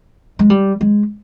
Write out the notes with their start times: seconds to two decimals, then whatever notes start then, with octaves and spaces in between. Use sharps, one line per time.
0.39 G#3
0.50 G3
0.81 G#3